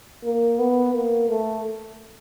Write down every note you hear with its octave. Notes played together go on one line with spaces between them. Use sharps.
A#3
B3
A#3
A3